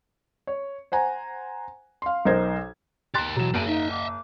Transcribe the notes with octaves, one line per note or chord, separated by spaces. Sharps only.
C#5
C5 F#5 G#5 A#5
F5 C6
B1 D#4 A#4 C5 G#6
G4 A#4 C6 F#6 A6
B2 E3 F#3 E7
F#1 F#4 G#4 D7 D#7
D#4 D#5 E5
D6